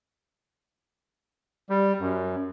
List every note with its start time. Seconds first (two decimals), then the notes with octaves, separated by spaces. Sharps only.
1.70 G3
2.00 F#2